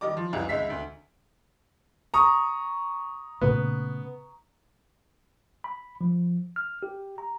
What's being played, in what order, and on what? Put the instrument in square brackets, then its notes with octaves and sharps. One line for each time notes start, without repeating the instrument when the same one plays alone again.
[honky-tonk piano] D#3 G3 D#5 D6
F3
C#2 F#2 C#3 E3 G3
C#2 G#3 D#4 E5 B6 C7
D2
[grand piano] A#5 C#6 D#6
[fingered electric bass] A#2 C#3 A3 [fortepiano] B3
[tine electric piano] B5
F3
F6
G4
A#5